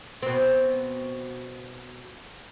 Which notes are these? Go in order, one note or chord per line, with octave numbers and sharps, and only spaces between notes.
B2 C4